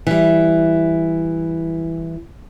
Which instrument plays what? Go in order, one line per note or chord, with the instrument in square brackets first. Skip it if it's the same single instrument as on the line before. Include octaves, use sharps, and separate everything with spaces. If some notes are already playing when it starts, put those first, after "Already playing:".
[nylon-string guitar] E3 G3